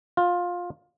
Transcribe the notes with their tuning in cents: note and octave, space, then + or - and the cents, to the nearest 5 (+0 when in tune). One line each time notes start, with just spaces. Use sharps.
F4 +15